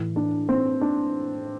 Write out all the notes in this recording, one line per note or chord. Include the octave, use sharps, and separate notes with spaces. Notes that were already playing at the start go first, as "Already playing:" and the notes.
Already playing: A2 E3
D4
C4
D4